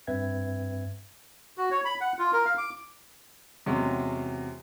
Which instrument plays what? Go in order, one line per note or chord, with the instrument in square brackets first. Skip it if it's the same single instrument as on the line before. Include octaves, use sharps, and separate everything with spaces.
[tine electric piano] G2 C4 B4 E5 G5 G#6
[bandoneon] F#4
C#5
B5
F#5
F4
A#4
F5
D6
[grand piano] E2 C3 F#3 G#3 C#4